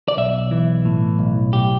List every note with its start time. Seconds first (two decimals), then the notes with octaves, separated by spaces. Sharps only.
0.08 D5
0.17 B1 E5
0.51 E3
0.85 A2
1.19 B1
1.53 B1 G4